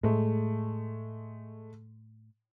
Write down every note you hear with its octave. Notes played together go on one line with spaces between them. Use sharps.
A2 G#3 A3